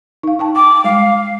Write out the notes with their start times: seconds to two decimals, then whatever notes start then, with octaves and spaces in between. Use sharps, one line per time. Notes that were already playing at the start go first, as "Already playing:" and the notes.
0.23 D#4 F5
0.39 D#4 G5 A5
0.56 G5 D6
0.84 G3 G#3 F5